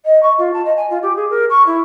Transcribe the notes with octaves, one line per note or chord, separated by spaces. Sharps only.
D#5
C#6
F4
A5
D#5
G#5
F4
G4
G#4
A#4
C#6
E4